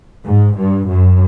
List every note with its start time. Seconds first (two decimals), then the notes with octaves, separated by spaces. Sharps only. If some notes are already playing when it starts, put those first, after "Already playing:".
0.25 G#2
0.57 G2
0.89 F#2